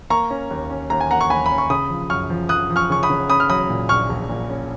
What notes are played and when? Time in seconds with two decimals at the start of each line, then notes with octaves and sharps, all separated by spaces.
0.10 A#3 A#5 C#6
0.30 C#4
0.51 D#2
0.70 C#4
0.90 D#2 A#5
1.01 G#5
1.10 A#3 F#5 A#5
1.21 C#6
1.30 D#2 G#5 B5
1.46 C#4 B5
1.58 C#6
1.70 C#3 B5 D#6
1.90 F3
2.10 F#2 C#6 F6
2.30 F3
2.49 F3 D#6 F#6
2.70 F3
2.76 C#6 F6
2.90 C#3 C#6
3.03 B5 D#6
3.10 C#3
3.29 C#4 B5 D#6
3.40 F6
3.49 F#3 B5 D#6
3.70 A#2
3.89 A#1 C#6 F6
4.10 A#1
4.29 A#2
4.50 C#4